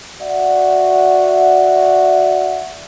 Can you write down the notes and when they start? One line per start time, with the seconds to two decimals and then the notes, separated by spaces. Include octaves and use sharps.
0.22 F#4 D5 E5 F#5